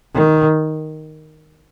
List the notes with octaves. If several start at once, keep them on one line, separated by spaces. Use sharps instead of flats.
D#3